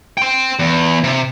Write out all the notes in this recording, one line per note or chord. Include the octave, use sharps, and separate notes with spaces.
G5 C6
E2
C3